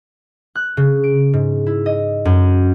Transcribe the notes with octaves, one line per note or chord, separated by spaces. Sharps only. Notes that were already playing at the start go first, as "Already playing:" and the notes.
F#6
C#3
D7
G#2
E4
D#5
F#2